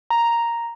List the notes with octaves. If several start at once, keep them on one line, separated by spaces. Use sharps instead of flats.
A#5